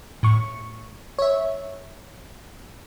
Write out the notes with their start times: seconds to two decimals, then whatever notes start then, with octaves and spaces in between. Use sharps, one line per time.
0.23 A2 C#6
1.19 C#5 E5